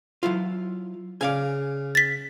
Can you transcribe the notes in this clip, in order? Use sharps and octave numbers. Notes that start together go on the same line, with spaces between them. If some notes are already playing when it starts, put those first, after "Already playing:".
F#3 E4 F4
C#3 D5 F5 G#5
A6 B6